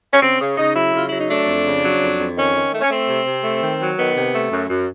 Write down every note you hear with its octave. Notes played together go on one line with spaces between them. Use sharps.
C#4
C#3 C4
C#3
C#3 D#4
F#3 E4
C#3 F4
F#3 E4
D#4
A3 D4
F2
C#3
F#3
F2
F2
D#3 C#4
D#3
A3
C#4
A3 C4
C3
C3
A3
D#3
F#3
D#3 B3
C3
A3
F#2
F#2